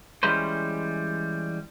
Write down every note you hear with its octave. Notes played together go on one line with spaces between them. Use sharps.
E3 G3 G#3 C#4 B4 C5